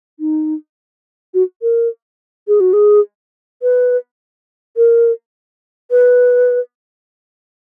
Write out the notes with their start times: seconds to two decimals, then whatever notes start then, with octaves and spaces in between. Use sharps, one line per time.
0.20 D#4
1.34 F#4
1.62 A#4
2.48 G#4
2.60 F#4
2.73 G#4
3.62 B4
4.77 A#4
5.91 B4